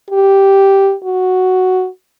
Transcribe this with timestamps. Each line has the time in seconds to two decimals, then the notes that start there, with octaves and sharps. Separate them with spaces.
0.10 G4
1.04 F#4